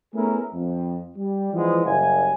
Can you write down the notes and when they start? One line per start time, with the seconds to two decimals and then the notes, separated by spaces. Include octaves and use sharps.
0.14 A3 B3 C#4 E4 G#4 A#4
0.54 F2
1.17 G3
1.54 E3 F3 G#3 B3 D4 E4
1.85 F#1 G3 G#5